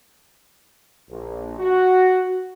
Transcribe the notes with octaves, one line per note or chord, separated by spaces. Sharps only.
A#1
F#4